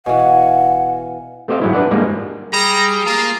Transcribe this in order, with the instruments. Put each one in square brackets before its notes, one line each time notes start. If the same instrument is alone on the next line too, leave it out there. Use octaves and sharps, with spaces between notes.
[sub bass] D1 [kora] B2 E3 [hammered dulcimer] F5 G#5 [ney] F#5
[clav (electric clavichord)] A3 C4 G4 C5 D#5 F5
G#2 F#3 G#3 E4
D4 B4 D5 F#5
G#2 F3 G3 G#3 A#3
[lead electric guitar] G3 [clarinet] G#4 [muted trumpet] A#5
[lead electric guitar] A#3 [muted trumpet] F4